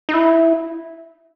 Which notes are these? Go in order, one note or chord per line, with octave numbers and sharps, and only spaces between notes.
D#4
E4